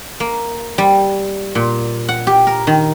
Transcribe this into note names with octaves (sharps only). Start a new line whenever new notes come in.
A#3
G3
A#2
F#5
G4
A#4
D#3